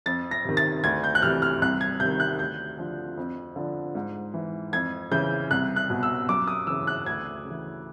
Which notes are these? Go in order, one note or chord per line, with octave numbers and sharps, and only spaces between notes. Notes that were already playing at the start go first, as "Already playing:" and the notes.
F2 A6
A#6
C3 D#3
A6
D2 G#6
G6
F#6
C3 E3 F6
F6
C2 F#6
G#6
C3 D#3 G6
F#6
D2 G6
D3 F3
F2
D3 F3
G#2
E3
F2 G#6
C#3 E3 G6
C2 F#6
F#6
B2
E6
F#2 D6
D#6
C#3 E3 E6
F#6
D2 G#6
C#3
E3